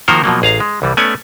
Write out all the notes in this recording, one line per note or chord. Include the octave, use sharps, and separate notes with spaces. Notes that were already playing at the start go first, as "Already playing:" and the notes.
D#3 F3 A#3 F#4 A#4 C5
B2 F3 F#3 A#3
A1 G#4 F5 A#5
G#3
C2 E3 G3
A3 B3 C#4 D5 G#5